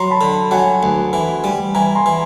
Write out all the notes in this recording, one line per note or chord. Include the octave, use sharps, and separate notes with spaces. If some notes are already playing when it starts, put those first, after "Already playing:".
Already playing: F#3 A#5 C6
A5 B5
D3
F#3 F#5 G#5
D2
E3
G3
E3 G#5 A#5
A#5 C6
E3